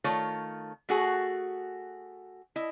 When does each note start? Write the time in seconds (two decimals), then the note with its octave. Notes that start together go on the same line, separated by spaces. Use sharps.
0.04 D#3 A3 F4 C#5
0.89 A3 F#4 G#4
2.56 E4 D#5